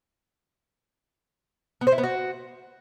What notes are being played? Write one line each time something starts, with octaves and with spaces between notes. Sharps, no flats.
B3
C5
E4
B3
F#4